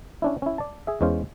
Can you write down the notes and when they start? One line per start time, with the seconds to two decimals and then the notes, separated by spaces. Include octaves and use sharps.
0.22 C#4 D4 E4
0.42 C#4 E4
0.58 D5 A5
0.87 G#4 E5
1.01 E2 G#3 C#4 C5 F5